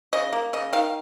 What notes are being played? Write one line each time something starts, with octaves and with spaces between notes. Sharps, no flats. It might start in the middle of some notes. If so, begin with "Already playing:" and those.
C#3 D#5
A#3
C#3 D#5
D#3 F5